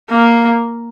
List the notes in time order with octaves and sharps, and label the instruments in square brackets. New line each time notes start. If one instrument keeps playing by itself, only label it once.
[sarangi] A#3